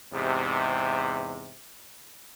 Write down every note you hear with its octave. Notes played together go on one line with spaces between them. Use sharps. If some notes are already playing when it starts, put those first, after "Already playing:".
E2 G#2 C3